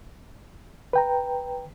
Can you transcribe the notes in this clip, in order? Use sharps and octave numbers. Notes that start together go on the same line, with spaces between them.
B4 G5 A#5